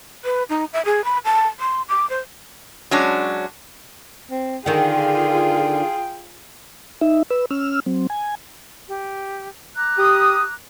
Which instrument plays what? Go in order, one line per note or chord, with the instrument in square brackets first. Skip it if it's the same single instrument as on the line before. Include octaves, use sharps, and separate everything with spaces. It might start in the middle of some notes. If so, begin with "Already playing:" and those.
[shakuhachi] B4
D#4
E5
G#4
B5
A5
C6
D6
C5
[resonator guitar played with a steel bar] F#3 G#3 C#4 D4
[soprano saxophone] C4
[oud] D3 D#3 [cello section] F4 G#4 [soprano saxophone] G5
[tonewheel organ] D#4 E5
B4 E6
C#4 E6 F6
F#3 C4
G#5
[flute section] G4
A#5 D6 F#6
[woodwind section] G4 D#6